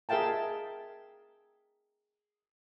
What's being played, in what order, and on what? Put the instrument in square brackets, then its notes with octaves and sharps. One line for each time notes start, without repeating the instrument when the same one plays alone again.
[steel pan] G#4 A#4 E5 F5 G5 A5